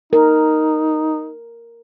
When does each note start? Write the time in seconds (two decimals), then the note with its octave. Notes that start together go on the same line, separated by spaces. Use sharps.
0.13 D#4 A#4